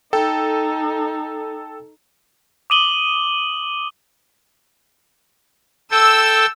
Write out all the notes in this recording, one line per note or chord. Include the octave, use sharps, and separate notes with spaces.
D#4 A4 G5
D6 D#6 D#7 F#7 G7
A4 G5 E6